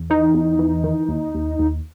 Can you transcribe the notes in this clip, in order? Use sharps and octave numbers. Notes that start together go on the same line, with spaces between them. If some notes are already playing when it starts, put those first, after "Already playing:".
Already playing: E2
E3 D#4
E2
E3
D#3
D#2
D#2
D#2